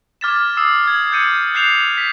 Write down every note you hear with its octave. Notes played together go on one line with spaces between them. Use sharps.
D6 F6 G#6 A6 B6 E7
D#6 E6 C7 E7
G#6
E6 G6 A6 C#7 D#7
F#6 G6 C7 E7 F7
B6 F7